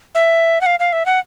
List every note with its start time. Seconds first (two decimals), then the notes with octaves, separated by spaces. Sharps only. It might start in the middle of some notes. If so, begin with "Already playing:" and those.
0.15 E5
0.61 F#5
0.66 F5
0.80 F5
0.93 E5
1.06 F#5